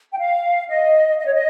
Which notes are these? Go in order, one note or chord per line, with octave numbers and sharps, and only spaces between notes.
G5
F5
D#5
D#5
C#5
D#5